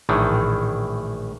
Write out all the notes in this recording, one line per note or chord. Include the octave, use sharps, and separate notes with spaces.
A#1 A2 D#3 E3